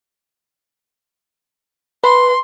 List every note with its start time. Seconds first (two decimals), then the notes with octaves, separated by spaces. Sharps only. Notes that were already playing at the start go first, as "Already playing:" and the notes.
2.04 B4 C6